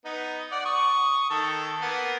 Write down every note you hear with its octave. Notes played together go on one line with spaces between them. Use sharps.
B3 D#4
D5 F#5
C#6 D#6
D#3 A4
A#3 B3